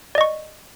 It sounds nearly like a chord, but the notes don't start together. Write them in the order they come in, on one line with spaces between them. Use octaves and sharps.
D5 D#5 C#6